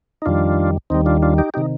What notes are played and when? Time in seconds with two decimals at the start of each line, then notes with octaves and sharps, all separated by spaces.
0.22 D#4
0.26 F2 D#3 G3 D4 F4
0.90 D#2 D#3 G3 C4 D#4
1.06 D4 F4
1.22 D4 F4
1.38 D#4 G4
1.54 C3 D#3 D#4 G4